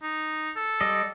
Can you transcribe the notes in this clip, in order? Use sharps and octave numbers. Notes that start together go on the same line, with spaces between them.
D#4
A4
G3 D#5